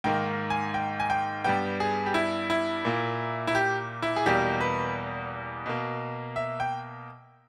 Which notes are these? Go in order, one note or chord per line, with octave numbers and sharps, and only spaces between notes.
G#2 D#3 A#3 G5
G#5
G5
G#5
G5
G2 G3 B3 G5
G#4
G4
E4
E4
A#2 A#3
E4
G4
E4
G#4
E2 B2 G3 A#3 G4
B4
B2 A#3
E5
G5